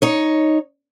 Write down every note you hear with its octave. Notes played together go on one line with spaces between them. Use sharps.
D#4 C#5